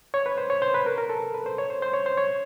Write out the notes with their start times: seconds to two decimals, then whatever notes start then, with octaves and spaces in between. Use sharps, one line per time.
0.14 C#5
0.26 B4
0.38 C5
0.50 C#5
0.62 C5
0.74 B4
0.86 A#4
0.98 A#4
1.09 A4
1.34 B4
1.46 C5
1.58 C#5
1.70 C5
1.82 C5
1.93 C#5
2.06 C5
2.18 C#5